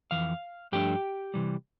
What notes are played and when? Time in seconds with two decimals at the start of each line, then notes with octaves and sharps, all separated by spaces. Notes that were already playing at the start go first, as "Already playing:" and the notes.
0.11 F2 E3 F5
0.72 G2 F3 A3 D4 G4 G5
1.34 C3 E3 G3